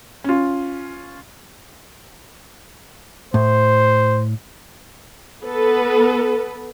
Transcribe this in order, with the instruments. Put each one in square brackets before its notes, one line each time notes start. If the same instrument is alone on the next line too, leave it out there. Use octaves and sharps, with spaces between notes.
[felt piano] C#4 F4
[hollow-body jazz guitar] A2 [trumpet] C5
[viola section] B3 A4 B4